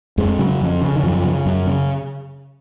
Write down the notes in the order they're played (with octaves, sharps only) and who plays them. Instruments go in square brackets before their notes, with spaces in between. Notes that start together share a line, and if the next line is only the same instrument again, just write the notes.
[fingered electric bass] F2 G#3
C#3 F#3
F2
C#3
D#3
F#2 F3
C#3
F#2
C#3